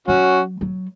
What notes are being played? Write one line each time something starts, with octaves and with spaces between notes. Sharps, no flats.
F#3 C#4 F#4
F#3